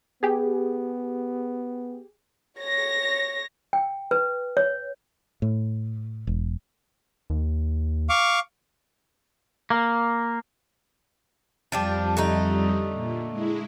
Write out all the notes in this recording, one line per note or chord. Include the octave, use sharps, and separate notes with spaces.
B3 G4 G#4
C#5 A#6
G5
B4
C#5
A2
E1
D#2
F5 C#6 D6
A#3
F2 F3 G3 D4 G4
D3 A3 D#4
A#2
G#3 E4